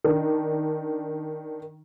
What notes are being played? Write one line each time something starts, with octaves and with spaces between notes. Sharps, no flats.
D#3 D4